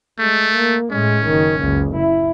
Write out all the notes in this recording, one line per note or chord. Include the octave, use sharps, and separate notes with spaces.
G#3 A3
A#3
A2 G#3 C#4
F#1 D#3
F#1 C#2
E4